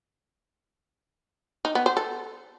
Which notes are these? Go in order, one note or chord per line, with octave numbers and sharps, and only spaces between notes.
D#4
B3
C5
A4